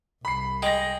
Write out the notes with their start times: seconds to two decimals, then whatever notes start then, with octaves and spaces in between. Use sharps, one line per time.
0.25 C2 B5 C7
0.62 G#3 G5 A#6